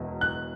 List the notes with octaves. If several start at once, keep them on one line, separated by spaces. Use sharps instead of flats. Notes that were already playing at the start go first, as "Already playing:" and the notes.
Already playing: E1 E2 B2
F#6